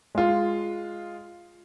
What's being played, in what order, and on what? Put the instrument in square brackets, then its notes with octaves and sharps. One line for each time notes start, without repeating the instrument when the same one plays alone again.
[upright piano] G#3 F4